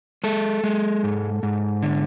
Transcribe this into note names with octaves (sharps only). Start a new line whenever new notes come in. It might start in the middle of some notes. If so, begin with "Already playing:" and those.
G#3 A4
G#3
G#2
G#2
D3